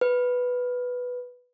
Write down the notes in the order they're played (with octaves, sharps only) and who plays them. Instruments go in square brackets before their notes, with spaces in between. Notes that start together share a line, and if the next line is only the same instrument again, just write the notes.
[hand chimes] B4